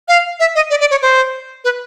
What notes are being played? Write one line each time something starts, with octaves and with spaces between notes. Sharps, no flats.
F5
E5
D#5
D5
D5
C#5
C5
B4